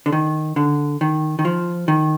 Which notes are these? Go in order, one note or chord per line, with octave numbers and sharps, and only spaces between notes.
D3
D#3
D3
D#3
D#3
F3
D#3